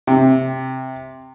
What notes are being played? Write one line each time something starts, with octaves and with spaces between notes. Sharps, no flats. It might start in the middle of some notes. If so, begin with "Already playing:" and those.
C3